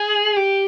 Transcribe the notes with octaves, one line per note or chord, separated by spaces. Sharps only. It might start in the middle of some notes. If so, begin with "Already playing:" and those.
Already playing: G#4
G4